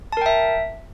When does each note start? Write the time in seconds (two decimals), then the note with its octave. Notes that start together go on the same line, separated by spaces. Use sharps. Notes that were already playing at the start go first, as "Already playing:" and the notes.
0.12 A5
0.17 A#4
0.21 G5
0.26 E5